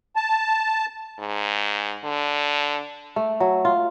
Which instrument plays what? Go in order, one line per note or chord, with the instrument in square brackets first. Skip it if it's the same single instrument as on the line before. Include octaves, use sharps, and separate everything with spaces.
[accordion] A5
[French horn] G#2
D3
[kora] A3
F#3
F4